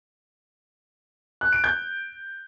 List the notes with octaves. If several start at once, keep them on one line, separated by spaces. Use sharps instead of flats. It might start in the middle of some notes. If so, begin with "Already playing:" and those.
F#6
D7
G6